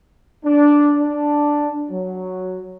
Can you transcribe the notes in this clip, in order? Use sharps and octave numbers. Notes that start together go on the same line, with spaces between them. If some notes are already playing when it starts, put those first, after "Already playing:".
D4
D4
F#3